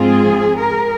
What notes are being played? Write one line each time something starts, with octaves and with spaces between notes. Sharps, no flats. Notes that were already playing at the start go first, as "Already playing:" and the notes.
Already playing: G#2 F3 C4 F4 G#4
A#4